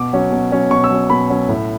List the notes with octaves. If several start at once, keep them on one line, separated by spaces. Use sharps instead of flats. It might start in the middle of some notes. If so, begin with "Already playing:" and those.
Already playing: B2 D6
F#3 C#4
B2
F#3 C#4
B2 C#6
E6
F#3 C#4
B2 B5
F#3 C#4
A2